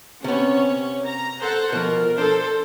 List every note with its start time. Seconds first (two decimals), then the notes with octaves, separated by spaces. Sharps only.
0.24 C3 B3 C#4 C#5
1.05 A#5
1.41 A4 C5 F#5
1.72 B2 F3 A#4
2.18 D4 A4 C5